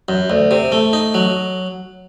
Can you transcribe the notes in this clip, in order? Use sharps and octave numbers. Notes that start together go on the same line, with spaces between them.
F#2
D2
C3
A3
D#4
F#3